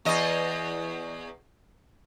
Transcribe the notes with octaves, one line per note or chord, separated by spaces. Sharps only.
E2 D#5